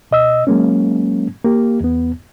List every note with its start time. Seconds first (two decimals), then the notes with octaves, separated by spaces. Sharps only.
0.11 B2 D#5 E6
0.47 F#3 G#3 A#3 C#4
1.44 A#3 G4
1.80 E2 B3